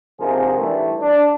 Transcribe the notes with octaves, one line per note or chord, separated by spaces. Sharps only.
A#1 G#2 C3 F3 G#4 A#4
D3 E3 G3 A3
D4